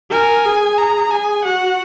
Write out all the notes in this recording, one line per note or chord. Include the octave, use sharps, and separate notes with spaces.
A#4 G#5
G#4
A#5
G#4 G#5
F#4 F#5